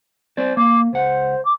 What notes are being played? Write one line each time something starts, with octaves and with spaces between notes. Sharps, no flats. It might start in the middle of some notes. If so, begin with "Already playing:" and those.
C4 C5 D5
A#3 D6
C#2 C5 F#5
D6